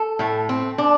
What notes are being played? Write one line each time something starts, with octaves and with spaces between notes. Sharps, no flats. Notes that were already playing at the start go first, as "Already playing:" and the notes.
Already playing: A4
A2 A3
C4
D4